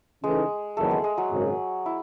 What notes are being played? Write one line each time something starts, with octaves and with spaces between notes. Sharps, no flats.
C#3 E3 G#3 A3 D#4 G#4
F#1 E2 D#3 F#3 A3 B3 A4
G#3 G#4
G#3 G#4
F#3 F#4
G#1 F#2 C#3
E4